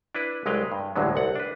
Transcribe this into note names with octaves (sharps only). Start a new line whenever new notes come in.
D4 E4 B4
C2 F#3 G#3 B4 F5 G5
G2
A1 D2 G2 D3 F#3 G#3
C2 F#5
D4 B4